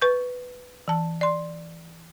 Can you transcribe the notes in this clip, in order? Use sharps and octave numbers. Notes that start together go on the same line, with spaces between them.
B4 C#6 G6
E3 A5
D5 C6